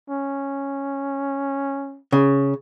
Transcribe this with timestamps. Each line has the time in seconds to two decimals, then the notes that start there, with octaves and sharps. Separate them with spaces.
0.10 C#4
2.12 C#3